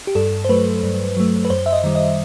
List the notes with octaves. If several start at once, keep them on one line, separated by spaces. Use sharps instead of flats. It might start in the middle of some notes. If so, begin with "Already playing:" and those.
G4
G2 A4
C5
F#3 A3 B4
G2
F#3 A3
B4
F#2 C5
E5
D#5
D#3 G3
D#5